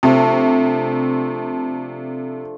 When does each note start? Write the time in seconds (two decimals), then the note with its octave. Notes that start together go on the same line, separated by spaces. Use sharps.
0.03 C3 F3 A3 D4